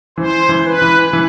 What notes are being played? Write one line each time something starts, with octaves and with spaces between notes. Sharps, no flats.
E3 C5
E3
B4
E3
E3